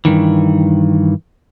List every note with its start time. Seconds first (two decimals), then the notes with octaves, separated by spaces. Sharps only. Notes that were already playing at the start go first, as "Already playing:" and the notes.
0.05 G2 D#3 E3